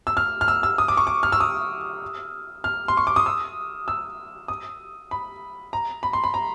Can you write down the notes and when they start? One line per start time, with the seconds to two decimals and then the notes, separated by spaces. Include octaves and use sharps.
0.07 E6
0.17 F6
0.41 F6
0.48 E6
0.63 E6
0.78 D#6
0.88 D6
0.97 C#6
1.07 D6
1.23 F6
1.32 E6
1.40 D#6
2.64 F6
2.88 C6
2.97 C#6
3.07 D6
3.16 D#6
3.26 E6
3.88 E6
4.48 D#6
5.11 B5
5.73 A#5
6.03 B5
6.13 C6
6.24 B5
6.34 A#5